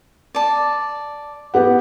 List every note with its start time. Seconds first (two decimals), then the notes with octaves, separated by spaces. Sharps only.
0.35 D5 A5
1.54 B3 G4 F#5